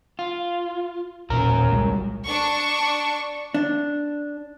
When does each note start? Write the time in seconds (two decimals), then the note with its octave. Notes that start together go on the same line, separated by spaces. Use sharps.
0.19 F4
1.30 E1 A#2 F#3 C#4 A#4 A#5
1.71 C2 G3 G#3
2.26 D4 C#6
3.54 D4